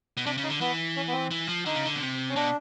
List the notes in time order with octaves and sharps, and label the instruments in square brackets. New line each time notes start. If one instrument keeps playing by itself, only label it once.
[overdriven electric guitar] B2
[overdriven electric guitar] C3 [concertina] D4
[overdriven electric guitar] C#3
[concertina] D#4
[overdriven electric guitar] D3
[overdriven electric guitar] E3 [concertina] B3
[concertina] C#4
B3
C4
[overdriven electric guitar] E3
F3
[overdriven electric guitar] D3 [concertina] D#4
[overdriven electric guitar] C#3
D3
B2
C3
[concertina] C#4
[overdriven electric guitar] B2 [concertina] D4